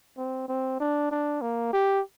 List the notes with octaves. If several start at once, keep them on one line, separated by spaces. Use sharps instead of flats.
C4
C4
D4
D4
A#3
G4